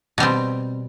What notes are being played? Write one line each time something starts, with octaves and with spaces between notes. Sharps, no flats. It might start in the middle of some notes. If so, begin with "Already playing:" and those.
B2 G3 C4